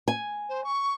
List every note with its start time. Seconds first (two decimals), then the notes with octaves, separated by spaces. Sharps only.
0.08 G#5
0.49 C5
0.64 C#6